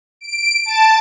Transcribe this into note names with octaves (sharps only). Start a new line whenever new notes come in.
D7
A5